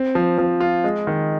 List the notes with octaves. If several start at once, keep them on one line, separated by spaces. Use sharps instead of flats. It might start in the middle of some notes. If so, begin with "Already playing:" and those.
Already playing: C4
F3
F3
F4
G#3
D#3